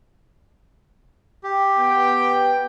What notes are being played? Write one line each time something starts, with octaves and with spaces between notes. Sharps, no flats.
G4
B3 G5